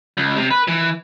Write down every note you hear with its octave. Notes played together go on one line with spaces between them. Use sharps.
C#2
C3
B4
E3